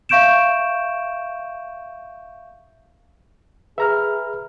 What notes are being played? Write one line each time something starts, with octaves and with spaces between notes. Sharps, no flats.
E5 F5 C#6 G6 D7 E7
G#4 B4 E5 A#5 F6